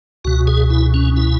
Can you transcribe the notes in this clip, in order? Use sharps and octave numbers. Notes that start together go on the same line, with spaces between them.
C#2 B2 F#4
G#4
E4
C#4
E4